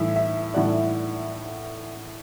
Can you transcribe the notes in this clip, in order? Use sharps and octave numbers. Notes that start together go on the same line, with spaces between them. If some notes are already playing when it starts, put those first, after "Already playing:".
Already playing: A2 E3 G3 E5
E5
A2 E3 G3 D5 F#5